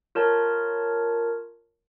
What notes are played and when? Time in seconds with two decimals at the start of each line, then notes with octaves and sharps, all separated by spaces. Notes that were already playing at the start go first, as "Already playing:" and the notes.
0.15 F4 A#4 C#5 A5